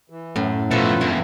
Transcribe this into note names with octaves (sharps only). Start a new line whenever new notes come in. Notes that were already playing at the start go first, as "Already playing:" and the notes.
E3
F#2 A2
B2 F3 A3 F4 A4 B4 E5
E2 G2 E4